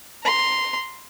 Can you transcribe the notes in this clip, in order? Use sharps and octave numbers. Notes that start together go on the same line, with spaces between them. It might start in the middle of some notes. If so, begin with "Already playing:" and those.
A#5 C6